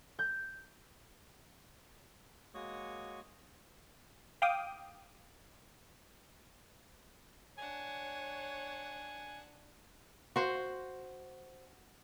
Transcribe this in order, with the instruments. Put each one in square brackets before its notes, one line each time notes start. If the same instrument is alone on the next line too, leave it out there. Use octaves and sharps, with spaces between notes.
[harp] G6
[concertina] G#3 A#3 F#4 C#5 C#6 D#6
[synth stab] F5 G5 D6 D#6
[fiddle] D4 F#5 [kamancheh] C#5 [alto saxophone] G#5
[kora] F#4 C5